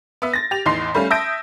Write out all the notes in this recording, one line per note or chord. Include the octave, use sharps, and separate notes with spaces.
B3 E5
A6 A#6
G4 F7
A1 E2 D#4 C6 C7
G3 A3 C#4 F5
E5 A5 D#6 G6 A#6 D7